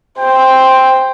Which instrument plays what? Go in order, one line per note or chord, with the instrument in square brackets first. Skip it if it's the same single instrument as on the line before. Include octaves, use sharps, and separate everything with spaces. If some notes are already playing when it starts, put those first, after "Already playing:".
[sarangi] C5 [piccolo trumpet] G5